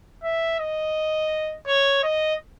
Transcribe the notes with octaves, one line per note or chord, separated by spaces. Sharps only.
E5
D#5
C#5
D#5